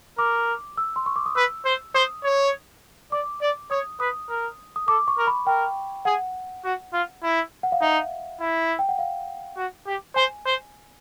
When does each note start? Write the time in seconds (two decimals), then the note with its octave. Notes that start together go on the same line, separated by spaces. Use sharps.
0.18 A#4 D6
0.78 E6
0.96 C6
1.06 C#6
1.16 D6
1.26 D#6
1.36 B4 E6
1.65 C5
1.94 C5 D#6
2.24 C#5
3.12 D5 D6
3.41 D5
3.71 C#5 D#6
4.00 B4 D#6
4.29 A#4
4.76 D#6
4.88 A4 D6
5.08 C#6
5.18 A#4
5.27 B5
5.47 A#4 G5
6.05 G#4 F#5
6.64 F#4
6.93 F4
7.23 E4
7.63 F#5
7.72 F5
7.81 D#4 E5
8.40 E4
8.79 G5
8.89 F#5
8.99 F5
9.57 F#4
9.86 G4
10.16 C5 G#5
10.46 C5